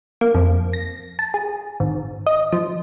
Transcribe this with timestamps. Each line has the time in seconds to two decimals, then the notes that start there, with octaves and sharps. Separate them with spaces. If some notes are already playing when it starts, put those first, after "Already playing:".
0.21 A#3
0.35 F2
0.73 A#6
1.19 A5
1.34 G#4
1.80 G#1
2.26 D#5
2.52 F3